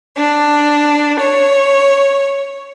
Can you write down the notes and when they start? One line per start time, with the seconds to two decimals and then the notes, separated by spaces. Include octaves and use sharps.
0.18 D4
1.19 C#5